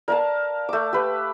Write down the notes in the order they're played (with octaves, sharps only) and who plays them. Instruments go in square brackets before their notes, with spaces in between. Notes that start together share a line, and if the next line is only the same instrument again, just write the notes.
[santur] A#4 F5 A5 [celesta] D5
[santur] A3 D6
G4 B4